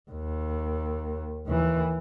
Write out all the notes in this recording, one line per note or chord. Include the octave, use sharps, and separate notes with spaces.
D#2
D#2 E3